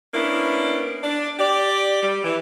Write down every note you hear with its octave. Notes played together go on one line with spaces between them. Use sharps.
A#3 B3 C#4 D4 E4
D4
G4 D5
G3
E3